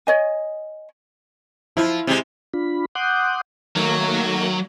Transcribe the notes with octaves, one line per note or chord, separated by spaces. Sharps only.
C#5 D#5 G#5
F3 E4
C3 G#3
D4 F4 B5
F#5 C6 D6 D#6 F#6 G6
D#3 F#3 A3 A#3